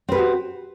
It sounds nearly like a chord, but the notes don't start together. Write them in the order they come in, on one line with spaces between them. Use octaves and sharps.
C4 B4 G4 F#4